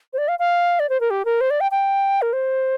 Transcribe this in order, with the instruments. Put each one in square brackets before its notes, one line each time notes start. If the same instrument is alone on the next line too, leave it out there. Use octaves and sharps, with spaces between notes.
[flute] C5
D5
F5
F5
D5
C5
A#4
G4
A#4
C5
D5
G5
G5
A#4
C5